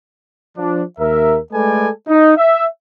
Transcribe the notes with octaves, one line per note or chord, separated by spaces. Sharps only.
F3 D4
D#2 A#4 E5
G#3 A3 A4 B4 D5 G#5
D#4
E5